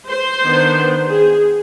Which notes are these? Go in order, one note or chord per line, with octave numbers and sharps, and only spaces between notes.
C5
D#3 B3 D4
G#4